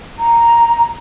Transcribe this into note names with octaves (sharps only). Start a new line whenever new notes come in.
A#5